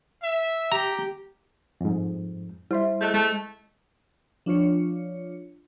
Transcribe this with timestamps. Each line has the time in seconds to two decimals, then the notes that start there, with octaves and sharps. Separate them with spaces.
0.22 E5
0.72 G4 A#5
1.81 F2 G#2
2.71 G3 E4 C5 E5 C6
3.01 A3 G#4 D#5 A5 F#6 G6
3.14 G#3 A3
4.46 F3 D4 F4 C#5 C#7